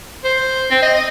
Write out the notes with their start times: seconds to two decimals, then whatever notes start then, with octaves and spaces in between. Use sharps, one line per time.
0.24 C5
0.71 C4
0.82 D#5
0.94 D#5